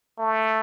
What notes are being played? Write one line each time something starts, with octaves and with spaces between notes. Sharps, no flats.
A3